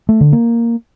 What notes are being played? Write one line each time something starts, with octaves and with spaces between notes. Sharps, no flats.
A3
D3
A#3